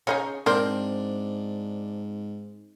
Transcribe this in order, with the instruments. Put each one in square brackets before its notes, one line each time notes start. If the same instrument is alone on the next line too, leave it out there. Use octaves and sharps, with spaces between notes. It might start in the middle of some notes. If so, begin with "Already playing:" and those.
[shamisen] C#3 D#4 G#4 [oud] C#5
[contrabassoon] G#2 [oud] C4 [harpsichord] D4 [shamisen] A#4 C5